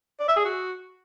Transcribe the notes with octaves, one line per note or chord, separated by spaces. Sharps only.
D5
E5
G#4
F#4